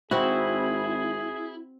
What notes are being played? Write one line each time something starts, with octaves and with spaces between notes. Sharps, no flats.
G#1 C4 E4 F#4 G#4